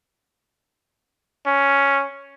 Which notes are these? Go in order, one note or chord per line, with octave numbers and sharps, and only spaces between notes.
C#4